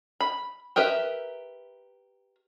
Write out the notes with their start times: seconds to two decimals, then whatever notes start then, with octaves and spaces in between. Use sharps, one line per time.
0.21 B5
0.76 G4 A#4 B4 E5